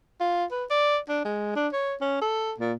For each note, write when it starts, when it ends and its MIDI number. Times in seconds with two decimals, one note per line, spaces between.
0.20 0.45 65
0.51 0.65 71
0.70 0.98 74
1.09 1.21 62
1.25 1.55 56
1.56 1.68 62
1.73 1.95 73
2.01 2.19 61
2.22 2.54 69
2.60 2.73 46